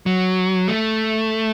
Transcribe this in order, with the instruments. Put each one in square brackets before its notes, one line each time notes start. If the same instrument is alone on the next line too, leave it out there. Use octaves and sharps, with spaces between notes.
[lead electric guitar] F#3
A3